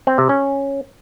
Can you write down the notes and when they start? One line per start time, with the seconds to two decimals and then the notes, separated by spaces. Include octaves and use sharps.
0.07 C4
0.18 C3
0.29 C#4